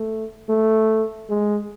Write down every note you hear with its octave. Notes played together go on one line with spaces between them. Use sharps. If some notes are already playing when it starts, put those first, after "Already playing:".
Already playing: A3
A3
G#3